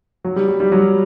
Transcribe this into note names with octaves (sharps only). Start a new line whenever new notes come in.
F#3
G3
G3
G3
F#3